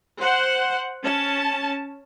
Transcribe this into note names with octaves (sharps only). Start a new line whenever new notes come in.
C5 F#5
C#4 A5